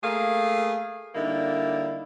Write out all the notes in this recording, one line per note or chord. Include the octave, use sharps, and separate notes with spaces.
A3 A#3 G#4 F5
D3 G3 A#3 D#4 E4